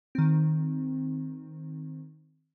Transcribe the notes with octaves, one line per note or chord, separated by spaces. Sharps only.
D#3 C4